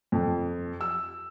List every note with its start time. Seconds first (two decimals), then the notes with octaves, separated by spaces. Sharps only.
0.12 F2
0.81 E6